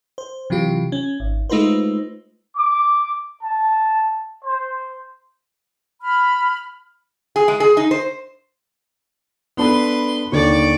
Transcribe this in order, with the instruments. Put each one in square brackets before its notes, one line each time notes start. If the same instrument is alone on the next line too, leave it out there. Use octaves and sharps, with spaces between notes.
[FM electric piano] C5
C3 E3 F#3 F4 G4
C#4
G#1
G#3 A3 D#4 F4 B4 C5
[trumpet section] D6
A5
C5
[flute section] B5 F6
[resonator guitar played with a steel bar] G#4
G#3
G#4
D#4
C5
[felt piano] B3 D4 A4 [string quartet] B4 C6
[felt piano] D#2 D3 [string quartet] D5 C#6